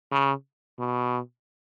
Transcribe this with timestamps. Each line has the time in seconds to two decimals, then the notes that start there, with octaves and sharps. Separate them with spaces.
0.12 C#3
0.79 B2